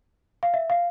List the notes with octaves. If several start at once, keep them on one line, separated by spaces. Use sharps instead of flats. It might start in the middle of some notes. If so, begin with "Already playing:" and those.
F5
E5
F5